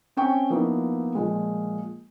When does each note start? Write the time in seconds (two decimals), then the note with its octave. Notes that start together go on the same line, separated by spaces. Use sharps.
0.17 C4 C#4 G5 C#6
0.50 F3 A#3 B3 D#4 E4
1.15 A#2 F3 G#3